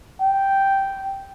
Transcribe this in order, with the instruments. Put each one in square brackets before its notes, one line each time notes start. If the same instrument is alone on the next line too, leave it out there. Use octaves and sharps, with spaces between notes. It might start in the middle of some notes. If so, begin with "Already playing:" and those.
[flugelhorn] G5